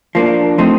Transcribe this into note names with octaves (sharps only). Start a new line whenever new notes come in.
F3 A#3 D4
F3 A3 C4 D#4